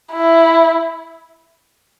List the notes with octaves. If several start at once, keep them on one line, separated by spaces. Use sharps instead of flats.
E4